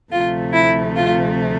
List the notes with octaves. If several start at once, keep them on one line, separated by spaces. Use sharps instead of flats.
D2 C3 F3 A3 F4
E4
F4